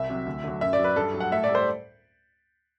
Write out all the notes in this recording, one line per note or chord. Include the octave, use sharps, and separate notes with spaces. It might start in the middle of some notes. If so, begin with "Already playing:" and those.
Already playing: C2 E5
C3 F#3
D2
D3 F#3
F#2 E5
D5
F#3 B4
G2 A4
F#3
F#5
A2 E5
D5
G3
C5